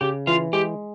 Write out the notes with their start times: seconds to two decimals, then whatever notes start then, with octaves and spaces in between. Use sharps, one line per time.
0.01 C#3 G4
0.27 E3 F4
0.53 G#3 G4